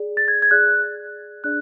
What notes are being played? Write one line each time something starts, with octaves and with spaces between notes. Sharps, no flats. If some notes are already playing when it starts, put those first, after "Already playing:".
Already playing: G#4 D5
A6
G#6
G#6
G#4 D5 F#6
D4 G#4 D5 F#6